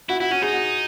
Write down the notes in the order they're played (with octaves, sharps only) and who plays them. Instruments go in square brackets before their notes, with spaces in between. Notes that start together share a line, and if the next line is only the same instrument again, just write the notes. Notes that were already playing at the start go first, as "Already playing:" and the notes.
[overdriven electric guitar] E4 [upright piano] F#4
[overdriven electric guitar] E4 [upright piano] F#4
[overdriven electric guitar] C#4 [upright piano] F#4
[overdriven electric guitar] D#4 [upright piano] G#4
[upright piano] F#4